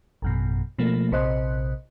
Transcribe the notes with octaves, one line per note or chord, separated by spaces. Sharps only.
A1 F#2 B2
B2 F3 A3 A#3
A#1 C3 C5 D#5 F#6